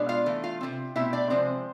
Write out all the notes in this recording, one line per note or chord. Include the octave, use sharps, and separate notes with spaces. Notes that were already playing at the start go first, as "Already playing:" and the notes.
Already playing: B2 G#3 D4
F4 F5
E3 A3
F4 F5
C3 G#3 C4
B2 A3 C4 E4 E5
D4 D5
C3 F3 G#3 C4 C5